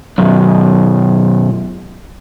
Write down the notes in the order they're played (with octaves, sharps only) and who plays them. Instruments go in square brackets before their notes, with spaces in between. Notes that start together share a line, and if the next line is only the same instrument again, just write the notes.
[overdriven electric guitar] B1 F#2